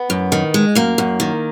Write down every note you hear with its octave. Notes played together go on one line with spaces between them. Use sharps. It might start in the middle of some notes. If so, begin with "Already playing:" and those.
Already playing: B3
F#2
D#3
G#3
F#2 A#3
F#2
D#3